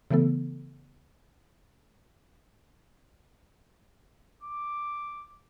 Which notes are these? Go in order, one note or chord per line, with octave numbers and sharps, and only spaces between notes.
C#3 E3 A3 B3 A4
D6